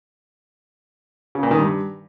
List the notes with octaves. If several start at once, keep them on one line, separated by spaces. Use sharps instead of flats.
C#3
A#2
D#3
G2